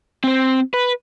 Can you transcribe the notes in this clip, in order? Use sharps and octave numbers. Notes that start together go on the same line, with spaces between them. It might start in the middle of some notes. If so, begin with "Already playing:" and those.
C4 C5
B4